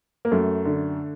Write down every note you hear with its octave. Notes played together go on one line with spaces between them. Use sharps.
A#3
F#2 A3
D3